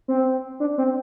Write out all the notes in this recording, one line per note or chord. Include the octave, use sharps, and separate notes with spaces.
C4
D4
C4